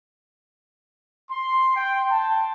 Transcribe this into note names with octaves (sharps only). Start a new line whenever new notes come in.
C6
G5
A5